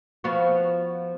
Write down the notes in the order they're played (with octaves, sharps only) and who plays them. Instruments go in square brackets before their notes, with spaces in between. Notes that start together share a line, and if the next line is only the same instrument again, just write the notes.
[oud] F3 B3 F#4